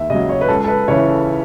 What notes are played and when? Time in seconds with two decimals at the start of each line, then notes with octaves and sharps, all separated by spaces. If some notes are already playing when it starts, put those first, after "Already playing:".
Already playing: D#2 E5
0.10 C#3 D#5
0.14 F#3
0.29 C#5
0.41 B4
0.48 C#2 A4
0.64 A4
0.68 B4
0.88 C#3 E3 C#5
1.06 A4